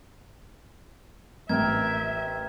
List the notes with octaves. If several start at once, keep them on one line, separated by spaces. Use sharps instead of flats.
A1 A#4 E5 G5 G#6